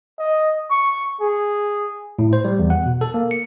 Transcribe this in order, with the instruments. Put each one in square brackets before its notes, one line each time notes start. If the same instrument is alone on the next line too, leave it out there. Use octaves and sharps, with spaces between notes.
[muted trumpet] D#5
C#6
G#4
[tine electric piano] A2
C5
G3
E2
F#5
B2
A4
A#3
C#7